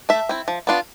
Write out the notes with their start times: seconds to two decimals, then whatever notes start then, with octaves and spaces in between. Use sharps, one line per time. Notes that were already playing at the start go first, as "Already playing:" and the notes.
0.09 A3 E5
0.29 C4 E4
0.48 F3
0.67 B3 D4 F4